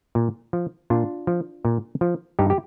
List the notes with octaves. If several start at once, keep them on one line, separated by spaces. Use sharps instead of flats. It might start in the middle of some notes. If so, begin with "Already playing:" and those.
A#2
F3
A#2 D4 F4
F3
A#2
F3
G2 D#4 G4
G4